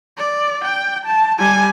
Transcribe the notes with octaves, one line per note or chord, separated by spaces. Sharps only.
D5
G5
A5
G3 G#5